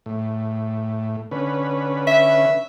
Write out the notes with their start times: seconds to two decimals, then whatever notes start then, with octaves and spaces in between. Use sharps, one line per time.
0.06 A2
1.31 D3 C#4 B4
2.07 E5